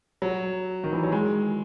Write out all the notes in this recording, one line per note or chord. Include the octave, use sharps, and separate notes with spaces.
F#3
D#3
E3
F#3
G#3